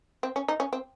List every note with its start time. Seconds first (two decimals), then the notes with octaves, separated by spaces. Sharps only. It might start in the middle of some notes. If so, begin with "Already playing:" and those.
0.23 C4
0.36 C#4
0.48 D#4
0.60 C#4
0.73 C4